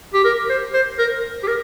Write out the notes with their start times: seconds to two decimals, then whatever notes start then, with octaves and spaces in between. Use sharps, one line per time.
0.14 G4
0.25 A#4
0.49 C5
0.74 C5
0.99 A#4
1.43 G4
1.48 A#4